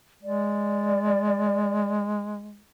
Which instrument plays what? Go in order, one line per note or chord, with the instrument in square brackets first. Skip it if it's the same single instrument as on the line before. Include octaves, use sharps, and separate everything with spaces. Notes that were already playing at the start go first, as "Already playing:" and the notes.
[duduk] G#3 [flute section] D5